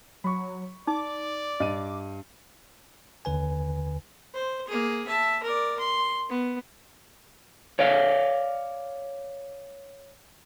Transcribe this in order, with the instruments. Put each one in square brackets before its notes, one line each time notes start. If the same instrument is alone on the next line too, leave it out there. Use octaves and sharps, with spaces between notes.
[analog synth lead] F#3 [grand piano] B5 C#6
[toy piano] D#4 [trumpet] D5 [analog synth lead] D6
[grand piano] G2 D#7 [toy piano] D#5
[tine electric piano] D#2 D3 B4 G#5
[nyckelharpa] C5
A#3 G#4
E5 A5
A#4 D5
C6
B3
[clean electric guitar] C#5 D5 F5